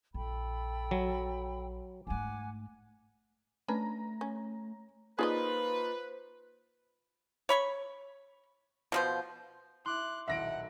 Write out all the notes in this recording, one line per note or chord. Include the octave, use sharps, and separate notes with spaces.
A#1 A4 G5 B5
F#3
G#2 A3 F#5 G#5 D6
A3 C#4 D4 B4 A#5
C#4
A#3 D#4 F4 G#4 B4 C5 D5 D#5
C#5 B5 C#6
B2 F3 C5
E4 C6 D6 F#6
D#1 B1 E4 E5 F#5 A#6 D7